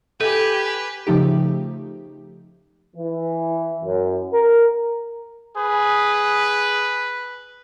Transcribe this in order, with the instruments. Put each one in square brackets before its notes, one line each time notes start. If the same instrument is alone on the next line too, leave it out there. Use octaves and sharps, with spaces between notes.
[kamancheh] G4 G#5 [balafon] A4 [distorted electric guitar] B4
[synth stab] C#3 F3 A3 D#4 G4
[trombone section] E3
F#2
A#4
[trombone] G#4 [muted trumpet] B4